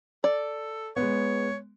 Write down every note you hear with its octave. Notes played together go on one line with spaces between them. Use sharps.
A4 D5
G#3 B3 C#5